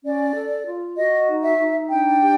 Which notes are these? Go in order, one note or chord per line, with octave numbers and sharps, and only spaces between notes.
C#4 D5
A4
F4
F#4 D#5
D#4
E5
D#4
D4 G5
G4